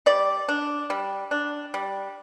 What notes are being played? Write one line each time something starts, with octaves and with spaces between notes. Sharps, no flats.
G3 D5
D4
G3
D4
G3